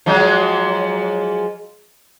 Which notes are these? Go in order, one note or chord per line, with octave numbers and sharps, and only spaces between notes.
F3 F#3 G#3